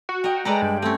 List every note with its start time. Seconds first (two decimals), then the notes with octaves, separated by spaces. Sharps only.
0.09 F#4
0.24 A#4 D#5 G5
0.45 G#3 A4 B4 D5 A#5
0.62 G2
0.82 A3 C4 C#4